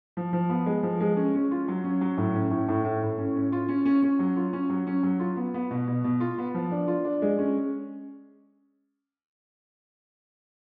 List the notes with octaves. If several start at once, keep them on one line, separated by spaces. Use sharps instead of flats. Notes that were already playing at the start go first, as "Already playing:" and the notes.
F3
F3
B3
G#3
F3
G#3
C#4
C#4
F4
F#3
C#4
F#3
A2
C#4
A2
A2
A2
A2
C#4
C#4
F4
C#4
C#4
C#4
F#3
F4
C#4
F#3
C#4
F#3
F4
B3
B3
B2
B2
B2
F4
B3
F3
D4
F4
D4
G#3
C#4